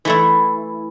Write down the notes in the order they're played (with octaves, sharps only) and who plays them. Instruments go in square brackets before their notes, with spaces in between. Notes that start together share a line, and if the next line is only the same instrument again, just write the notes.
[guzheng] E3 A3 E4